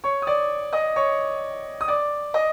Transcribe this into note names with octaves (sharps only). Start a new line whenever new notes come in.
C#5 C#6
D#6
D5 D6
D#5 D#6
C#5 C#6
D#6
D5 D6
D#5 D#6